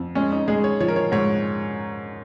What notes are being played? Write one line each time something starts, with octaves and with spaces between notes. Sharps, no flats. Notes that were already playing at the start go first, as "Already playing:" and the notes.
Already playing: F2
G#3 C#4
D#4
G#3 G#4
C#5
F3 C#5
A#4
C#5
G#2 C#5